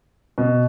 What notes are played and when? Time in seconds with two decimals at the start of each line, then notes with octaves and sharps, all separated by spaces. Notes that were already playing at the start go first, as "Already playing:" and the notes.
0.38 B2